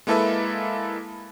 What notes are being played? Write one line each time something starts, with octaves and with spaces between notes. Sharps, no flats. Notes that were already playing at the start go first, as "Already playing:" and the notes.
G#3 A#3 E4 A4 B4 E5